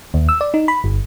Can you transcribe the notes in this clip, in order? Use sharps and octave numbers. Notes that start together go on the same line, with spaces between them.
D#2
E6
D5
D#4
B5
G1